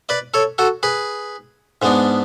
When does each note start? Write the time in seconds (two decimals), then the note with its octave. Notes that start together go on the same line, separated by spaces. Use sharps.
0.09 B4 D5
0.34 A4 C#5
0.58 F#4 A4
0.83 G#4 B4
1.82 G#2 G#3 B3 D4